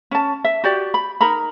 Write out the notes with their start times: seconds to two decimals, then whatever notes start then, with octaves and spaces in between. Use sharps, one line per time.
0.11 C#4 A5
0.44 E5
0.64 F#4 G4 D5
0.94 B5
1.21 D#4 A#4 A#5 B5